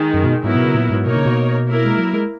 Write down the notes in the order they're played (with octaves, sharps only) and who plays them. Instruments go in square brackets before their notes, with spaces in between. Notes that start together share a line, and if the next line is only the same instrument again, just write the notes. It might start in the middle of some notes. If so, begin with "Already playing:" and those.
Already playing: [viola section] D#3 G#3 D#4
[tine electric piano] F#2
B2
[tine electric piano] G#2 [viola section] F#3 B3 E4 A#4
[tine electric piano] B2
C#3
A#2
G#2
[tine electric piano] B2 [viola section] A#3 D#4 A#4 C#5
[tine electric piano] C#3
B2
[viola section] A#3 E4 A#4
[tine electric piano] G#3
F#3
G#3